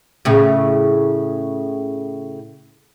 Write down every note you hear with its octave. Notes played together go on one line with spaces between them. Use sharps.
A2 C#3